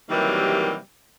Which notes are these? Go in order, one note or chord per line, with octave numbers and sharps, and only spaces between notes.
C3 D#3 E3 F#3 G3 A#3